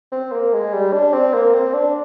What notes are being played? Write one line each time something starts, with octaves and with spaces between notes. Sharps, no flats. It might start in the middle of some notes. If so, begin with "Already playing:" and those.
C4
A#3
G#3
G3
D4
C4
A#3
C4
D4